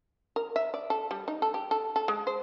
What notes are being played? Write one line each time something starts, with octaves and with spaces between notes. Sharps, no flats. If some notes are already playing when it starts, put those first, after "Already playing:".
A#4
E5
D5
A4
G3
D#4
A4
G4
A4
A4
G#3
C5